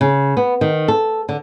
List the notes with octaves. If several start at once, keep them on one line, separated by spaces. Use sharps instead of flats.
C#3
B3
D#3
A4
D3